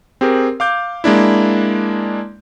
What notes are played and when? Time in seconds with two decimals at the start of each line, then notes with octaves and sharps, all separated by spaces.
0.21 C4 G4 G#4 A#4
0.60 F5 D6 G6
1.04 G#3 A#3 D4 E4